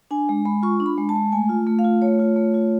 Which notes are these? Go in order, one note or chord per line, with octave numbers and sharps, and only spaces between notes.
D4 G#5
G#3
G#3 B5
F4 C#6
D4
B5
G#3
A5
G#3
A3 G#5
F4
A3
F5
F4
A3 C#5
F4
A3
F4